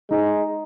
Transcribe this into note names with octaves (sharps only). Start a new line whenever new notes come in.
G#3 D#4